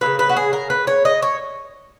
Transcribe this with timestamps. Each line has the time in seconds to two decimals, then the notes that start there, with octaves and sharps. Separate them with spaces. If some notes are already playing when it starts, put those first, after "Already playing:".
0.01 F#3 A#3 B4
0.06 C#3
0.19 B4
0.29 F#4
0.36 G#4
0.53 A#4
0.70 B4
0.87 C#5
1.05 D#5
1.22 C#5